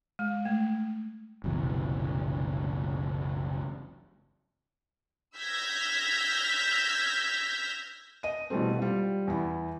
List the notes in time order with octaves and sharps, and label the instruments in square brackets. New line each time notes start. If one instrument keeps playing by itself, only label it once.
[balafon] G#3
A3
[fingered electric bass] F#1 C2 B2 E3
[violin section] E6 F6 G6 G#6 A#6 B6
[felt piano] D#5 D#7
B2 E3 G3 A3 C4
G3 F4
E2 E4